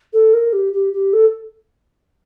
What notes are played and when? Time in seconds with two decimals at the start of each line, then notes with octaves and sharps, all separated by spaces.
0.13 A4
0.33 A#4
0.53 G4
0.73 G4
0.93 G4
1.13 A4